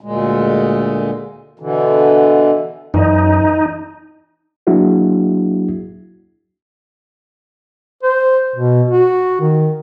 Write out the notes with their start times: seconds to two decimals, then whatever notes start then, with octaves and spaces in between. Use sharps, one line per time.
0.01 D2 A#2 G#3
1.60 B2 D3 E3
2.94 F#2 E3 D#4 D#5
4.67 F#3 A#3 D4 E4 F#4 G#4
8.03 C5
8.56 B2
8.91 F#4
9.41 D#3